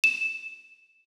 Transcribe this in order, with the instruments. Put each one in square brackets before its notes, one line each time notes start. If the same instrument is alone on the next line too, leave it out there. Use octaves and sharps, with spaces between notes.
[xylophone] E7